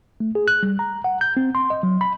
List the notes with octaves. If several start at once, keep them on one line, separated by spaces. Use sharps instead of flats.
A3
G#4
F#6
G3
A#5
F#5
G6
C4
C6
D#5
F#3
B5